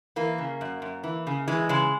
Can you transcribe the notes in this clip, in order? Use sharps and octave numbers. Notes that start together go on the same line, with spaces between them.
E3 A#3
C#3
F#2
F#2
E3
C#3
E3 G#3
C#3 G#3